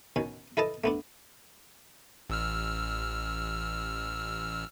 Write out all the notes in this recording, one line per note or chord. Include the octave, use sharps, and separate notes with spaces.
B2 D#3 C#4
E4 A4 B4 D#5 A5
A3 B3 D4
A1 E6 F6